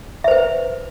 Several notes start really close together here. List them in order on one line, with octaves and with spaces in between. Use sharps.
E5 C5 B4